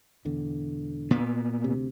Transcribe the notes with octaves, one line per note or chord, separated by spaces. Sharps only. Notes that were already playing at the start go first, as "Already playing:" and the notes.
E1 E2 D3
A#2 B3
D2 C3